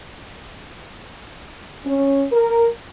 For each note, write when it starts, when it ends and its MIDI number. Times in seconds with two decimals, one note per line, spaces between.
1.85 2.25 61
2.31 2.67 70